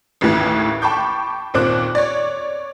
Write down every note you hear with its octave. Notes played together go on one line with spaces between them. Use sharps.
A1 D#2 A2 E3
G5 A5 B5 C#6 D6 G6
D#2 A#2 C4 D6 F#6
C#5 D5